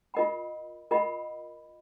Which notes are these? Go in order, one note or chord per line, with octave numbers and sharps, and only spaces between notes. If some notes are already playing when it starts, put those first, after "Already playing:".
F4 A#4 D#5 F#5 B5
F4 A#4 D#5 F#5 B5